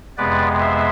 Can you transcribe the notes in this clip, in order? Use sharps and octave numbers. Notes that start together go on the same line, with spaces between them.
F2 C3 G#3 B3 B4 D5
C5 E5